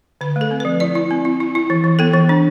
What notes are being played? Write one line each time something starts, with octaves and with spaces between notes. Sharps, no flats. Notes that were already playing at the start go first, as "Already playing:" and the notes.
D3 B4
A3
A4
C4
B4
F3
E4 D5
E4
C4
E4
E4
E4
E3
E3
B3 A4
E3
D4